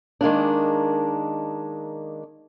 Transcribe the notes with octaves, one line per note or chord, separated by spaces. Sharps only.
D#3 G#3 A#3 D4